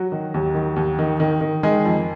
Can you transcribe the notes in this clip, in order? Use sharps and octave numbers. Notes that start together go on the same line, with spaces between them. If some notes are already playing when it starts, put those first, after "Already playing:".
Already playing: F#3 F#4
D#3
D#2
D#3
D#2
D#3
D#3
D#3
D#3 G#3 G#4
F2